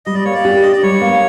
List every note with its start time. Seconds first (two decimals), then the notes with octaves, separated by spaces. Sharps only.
0.06 G3 D#5
0.15 D5
0.25 A#3 C#5
0.34 D5
0.45 G4
0.62 D4 D#5
0.72 D5
0.83 G3 C#5
1.01 A#3